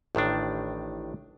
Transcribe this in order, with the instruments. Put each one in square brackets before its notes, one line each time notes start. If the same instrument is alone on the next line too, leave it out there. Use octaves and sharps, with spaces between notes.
[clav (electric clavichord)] A1 A2 D#3 D4